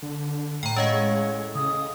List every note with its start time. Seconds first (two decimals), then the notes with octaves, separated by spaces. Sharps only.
0.02 D3
0.63 A2 G5 A#5
0.76 G#3 C#4 C#5 D#5 F5
1.55 C#3 D#6